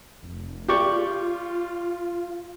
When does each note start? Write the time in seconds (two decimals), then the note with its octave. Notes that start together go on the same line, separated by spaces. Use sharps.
0.22 F1
0.68 F4 G4 D5 C#6